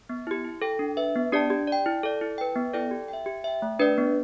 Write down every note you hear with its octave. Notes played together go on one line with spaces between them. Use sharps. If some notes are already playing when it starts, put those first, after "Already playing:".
B3
E4 G4
E4
A4 G5
D4
B4 E5
B3
D4 G4 D5 A5
G4
D5 G5
E4
A4 D5
E4
B4 G5
B3
E4 A4 D5 G5
G4
E5 G5
G4
E5 G5
A3
D4 B4 D5
B3